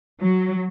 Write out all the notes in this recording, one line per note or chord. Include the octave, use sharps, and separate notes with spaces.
F#3